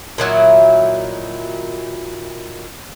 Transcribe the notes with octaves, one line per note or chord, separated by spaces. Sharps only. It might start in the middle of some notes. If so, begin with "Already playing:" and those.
A#2 D#3 F#3 E4